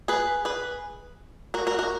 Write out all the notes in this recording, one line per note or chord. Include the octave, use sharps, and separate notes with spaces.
G#4 B4
G#4 B4
F#4 A#4
F#4 A#4
F#4 A#4